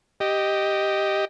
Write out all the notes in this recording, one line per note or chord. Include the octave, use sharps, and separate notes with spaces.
G4 D#5